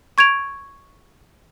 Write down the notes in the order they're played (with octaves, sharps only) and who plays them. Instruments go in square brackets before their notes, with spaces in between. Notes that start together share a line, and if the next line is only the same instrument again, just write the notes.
[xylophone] C#6 G#6 D7 F7